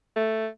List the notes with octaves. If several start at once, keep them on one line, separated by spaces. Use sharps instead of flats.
A3